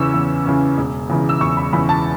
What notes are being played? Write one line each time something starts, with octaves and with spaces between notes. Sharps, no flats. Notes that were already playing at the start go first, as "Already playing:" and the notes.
Already playing: E2 C#3 E3 C#4 C#6 E6
E2
C#3 E3 C#4
E1
E2 C#3 E3
E6
E1 C#6
B5
E2 C#3 E3 B5
A5